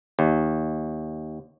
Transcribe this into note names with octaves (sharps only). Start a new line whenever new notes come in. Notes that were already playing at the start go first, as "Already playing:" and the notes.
D#2